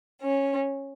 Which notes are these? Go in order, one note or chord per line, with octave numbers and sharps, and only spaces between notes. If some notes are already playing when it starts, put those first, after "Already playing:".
C#4